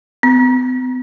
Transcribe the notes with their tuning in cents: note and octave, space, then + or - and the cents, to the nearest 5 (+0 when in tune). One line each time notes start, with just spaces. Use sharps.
B3 +45